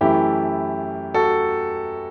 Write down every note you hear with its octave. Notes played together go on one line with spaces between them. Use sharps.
F#2 E3 A3 E4 G4
F#4 A4